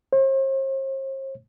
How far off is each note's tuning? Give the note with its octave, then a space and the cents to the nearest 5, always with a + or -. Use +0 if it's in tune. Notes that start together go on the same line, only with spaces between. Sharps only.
C5 +45